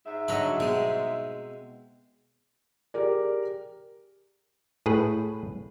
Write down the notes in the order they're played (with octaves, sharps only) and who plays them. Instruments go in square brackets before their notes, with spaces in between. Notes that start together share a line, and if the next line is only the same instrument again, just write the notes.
[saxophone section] G#2 E5
[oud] D3 F#3 [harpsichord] D#5 A#5 B5
[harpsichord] B2 G#3 [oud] C4
[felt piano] G4 G#4 A#4 D5
[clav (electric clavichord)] A2 G#4 B4